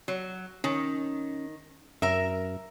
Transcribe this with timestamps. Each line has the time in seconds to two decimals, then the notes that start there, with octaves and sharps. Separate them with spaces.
0.08 F#3
0.64 D#3 C#4
2.02 F#2 A#4 E5